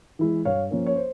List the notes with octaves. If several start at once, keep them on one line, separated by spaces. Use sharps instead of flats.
E3 G#3 E4
G2 C#5 F5
F3 A#3 C#4
C#5
C5